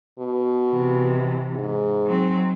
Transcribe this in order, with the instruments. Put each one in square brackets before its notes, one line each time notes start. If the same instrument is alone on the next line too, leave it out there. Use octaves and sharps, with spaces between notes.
[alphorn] B2
[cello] C3 E3
[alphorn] G#2
[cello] F#3 C4